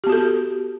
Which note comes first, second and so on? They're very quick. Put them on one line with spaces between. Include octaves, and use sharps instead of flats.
G4 B3 F#4 A4